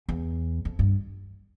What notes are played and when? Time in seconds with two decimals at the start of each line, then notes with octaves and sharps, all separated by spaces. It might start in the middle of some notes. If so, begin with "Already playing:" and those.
0.09 E2
0.65 F2
0.79 G2